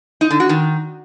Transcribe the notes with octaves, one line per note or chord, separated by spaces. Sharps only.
D#4
D3
F#4
D#3